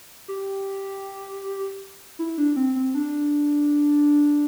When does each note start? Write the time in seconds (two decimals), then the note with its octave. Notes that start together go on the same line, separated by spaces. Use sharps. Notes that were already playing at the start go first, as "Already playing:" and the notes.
0.28 G4
2.19 E4
2.38 D4
2.56 C4
2.76 C4
2.94 D4